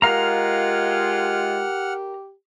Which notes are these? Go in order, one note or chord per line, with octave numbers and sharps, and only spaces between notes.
G#3 F4 G4 A#4 F5 F#5 A#5 F6